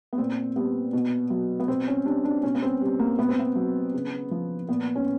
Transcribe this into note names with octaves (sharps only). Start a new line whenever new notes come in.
B3
A#2 C4
G3 B3
B2
F#3
B3
B2 C4
C#4
G3 D4
D4
B2 C#4
B3
C4
G3
A#3
B2 B3
C4
B3
F#3
C#3
F3
A#2 B3
C#4